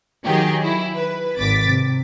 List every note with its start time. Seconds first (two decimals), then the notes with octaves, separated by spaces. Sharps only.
0.24 D#3 F#3 G4 G#4
0.64 E4
0.95 B4
1.39 G#1 D6 A6 B6
1.68 C3